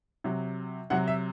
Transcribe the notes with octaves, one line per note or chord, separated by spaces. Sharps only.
C3 F#3
C3 F#3 F#5
E5